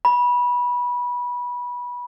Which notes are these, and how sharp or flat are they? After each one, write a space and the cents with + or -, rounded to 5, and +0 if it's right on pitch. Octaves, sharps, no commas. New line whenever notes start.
B5 -20